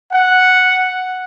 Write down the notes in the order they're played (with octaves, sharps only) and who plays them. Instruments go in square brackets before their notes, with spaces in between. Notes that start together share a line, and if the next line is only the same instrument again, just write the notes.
[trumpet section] F#5